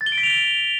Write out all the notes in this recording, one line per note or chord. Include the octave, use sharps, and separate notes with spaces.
A6
G7
D7
B6
F7